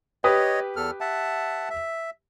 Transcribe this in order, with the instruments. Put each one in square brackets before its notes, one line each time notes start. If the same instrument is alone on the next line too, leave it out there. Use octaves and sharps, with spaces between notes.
[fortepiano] G4 B4 D#6 [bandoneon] C#5 D#5
[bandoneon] E2 A4 F6
E5 F#5 A5
E5